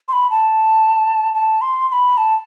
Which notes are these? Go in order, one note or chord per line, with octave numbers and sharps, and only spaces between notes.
C6
B5
A5
A5
C6
C6
B5
A5